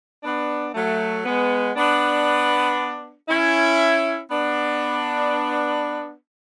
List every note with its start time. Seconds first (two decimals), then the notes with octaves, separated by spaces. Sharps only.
0.24 B3 D4
0.74 F#3 A3
1.26 G#3 B3
1.76 B3 D4
3.28 C#4 E4
4.30 B3 D4